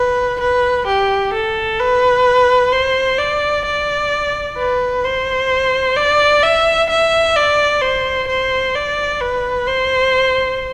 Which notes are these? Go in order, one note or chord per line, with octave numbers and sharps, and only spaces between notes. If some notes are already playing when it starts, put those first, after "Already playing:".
Already playing: B4
B4
G4
A4
B4
C5
D5
D5
B4
C5
D5
E5
E5
D5
C5
C5
D5
B4
C5